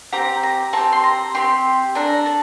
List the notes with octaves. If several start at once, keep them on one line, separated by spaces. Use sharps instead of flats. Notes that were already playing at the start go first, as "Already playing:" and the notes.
C4 G4 A#5
A#5
C4 G4 A5
C6
A#5
C4 G4 C6
D4 A4 A#5
A5